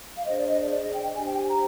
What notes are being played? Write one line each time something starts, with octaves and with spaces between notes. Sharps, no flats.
F5
D4 G#4 C5 D#5
D5
D#5
D5
D5
D#5
G5
D4 G4 C5 G#5
G5
G#5
A#5